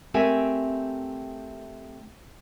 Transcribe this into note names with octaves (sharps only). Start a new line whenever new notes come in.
A3 C4 G4 A#4 E5 G#5